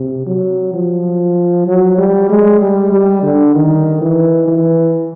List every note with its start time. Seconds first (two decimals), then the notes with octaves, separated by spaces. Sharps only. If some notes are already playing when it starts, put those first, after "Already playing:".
Already playing: C3
0.26 F#3
0.73 F3
1.67 F#3
1.98 G3
2.30 G#3
2.61 G3
2.92 G3
3.23 D3
3.55 D#3
4.01 E3
4.48 E3